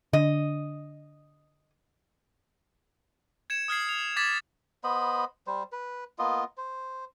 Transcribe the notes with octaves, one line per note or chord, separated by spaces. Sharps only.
D3 D#5
G#6 C#7 E7
D#6 F6 G#6 C7
F7
D6 G#6 A6 B6 E7
B3 C5 D#5 B5
G3 C5
B4
A#3 B3 F4 D#5
C5